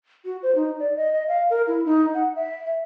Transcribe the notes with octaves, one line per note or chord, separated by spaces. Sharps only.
F#4
C5
D#4
D5
D#5
D#5
F5
A#4
E4
D#4
F#5
E5